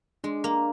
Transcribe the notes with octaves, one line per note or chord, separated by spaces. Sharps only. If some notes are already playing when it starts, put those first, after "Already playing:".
G#3 D4
A#3